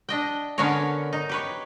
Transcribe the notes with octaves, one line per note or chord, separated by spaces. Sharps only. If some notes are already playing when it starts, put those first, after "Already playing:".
D4 D#5 G5
D3 B3 C#4 A#4 C#5
D#4
G4 B4 C#5